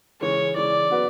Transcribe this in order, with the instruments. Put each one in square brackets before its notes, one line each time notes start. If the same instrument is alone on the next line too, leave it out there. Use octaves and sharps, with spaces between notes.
[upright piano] C#3 E3 G#3 [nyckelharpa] C#5
[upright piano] C#3 E3 G#3 [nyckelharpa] D5
[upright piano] F#3 B3 F#4 B4